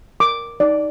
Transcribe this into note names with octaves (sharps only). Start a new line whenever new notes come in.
A#4 D6
D#4 D5